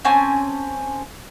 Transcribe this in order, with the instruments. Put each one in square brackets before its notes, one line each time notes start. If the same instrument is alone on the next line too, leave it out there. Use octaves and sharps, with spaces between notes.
[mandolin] C4 C#4 G#5 A5